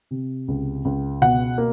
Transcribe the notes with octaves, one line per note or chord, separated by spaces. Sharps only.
C3
C#2
C#2
B2 F#5
A#3